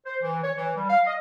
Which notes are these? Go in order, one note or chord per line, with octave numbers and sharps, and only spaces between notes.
C5
E3
C#5
E3
G3
F5
D#5